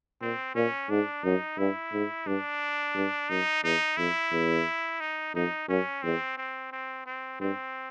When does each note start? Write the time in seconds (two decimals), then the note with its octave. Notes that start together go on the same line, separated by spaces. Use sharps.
0.21 A#2 C4
0.55 A#2 C#4
0.90 G#2 D4
1.24 F#2 D#4
1.58 G2 E4
1.93 G#2
2.26 G2 D4
2.95 G2
3.29 F#2 D#4
3.64 E2 D#4
3.97 F2 E4
4.32 E2
5.00 D#4
5.35 F2 D#4
5.68 F#2 C#4
6.03 E2 C4
6.37 C4
6.72 C4
7.06 C4
7.40 G2 C4